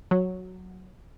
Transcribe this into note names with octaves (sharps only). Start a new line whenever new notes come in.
F#3